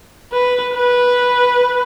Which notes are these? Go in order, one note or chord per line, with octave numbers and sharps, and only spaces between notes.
B4
B4